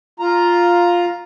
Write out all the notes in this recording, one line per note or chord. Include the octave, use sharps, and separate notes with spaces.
F4 A#5